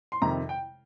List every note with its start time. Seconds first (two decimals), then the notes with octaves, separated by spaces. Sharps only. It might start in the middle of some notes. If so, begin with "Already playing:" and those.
0.12 C6
0.21 F2 C3 D#3 A#5
0.49 G5